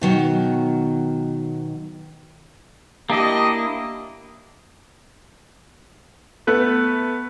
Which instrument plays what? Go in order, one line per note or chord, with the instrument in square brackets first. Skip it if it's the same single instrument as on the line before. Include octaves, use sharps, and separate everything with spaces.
[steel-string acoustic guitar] B2 D#3 F#3
[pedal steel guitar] A#3 D4 E4 [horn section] G4 D#5
[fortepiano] A3 B3 B4